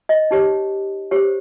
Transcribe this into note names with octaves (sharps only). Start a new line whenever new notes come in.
D#5
D#4 G4 C#5
G4 C5 C#5